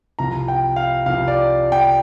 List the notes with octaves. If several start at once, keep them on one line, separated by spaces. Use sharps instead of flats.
C2 C3 F3 A#5
G5
F5
C2 C3 F3 F5
D5
G5